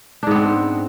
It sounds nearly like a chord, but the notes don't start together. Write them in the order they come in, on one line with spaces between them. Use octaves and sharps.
D4 G#2 B3 C4